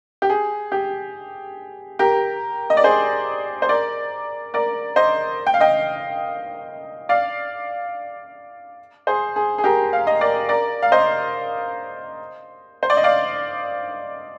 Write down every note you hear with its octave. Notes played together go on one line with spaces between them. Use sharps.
G4
G#4
G4
G4 A#4
D#5
D5
G#4 C5
C5
A#4 D5
A#4 D5
C5 D#5
G5
F5
D#5 G5
D5 F5
G#4 C5
G#4
G#4
G4 A#4
F5
D#5
A#4 D5
A#4 D5
F5
C5 D#5
C5
D5
D#5
D5 F5